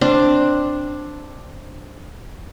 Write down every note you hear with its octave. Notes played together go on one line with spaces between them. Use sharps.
C4 D4